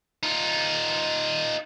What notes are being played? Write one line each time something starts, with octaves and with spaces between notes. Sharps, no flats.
D#4 F4